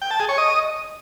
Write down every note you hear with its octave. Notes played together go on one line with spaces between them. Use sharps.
G5
A5
G#4
C#5
D#5